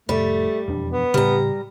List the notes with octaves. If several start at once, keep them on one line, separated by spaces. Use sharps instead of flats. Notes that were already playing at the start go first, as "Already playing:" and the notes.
F1 A2 G3 A3
E1 F2 D4
B3
A2 C#3 G3 A#5